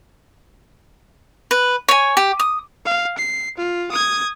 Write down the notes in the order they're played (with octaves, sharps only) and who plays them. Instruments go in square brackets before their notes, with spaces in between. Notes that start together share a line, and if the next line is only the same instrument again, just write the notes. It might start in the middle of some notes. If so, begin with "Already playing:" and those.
[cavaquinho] B4
C#5 G#5
G4
D#6
[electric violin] F5
C7
F4
D#6 G#6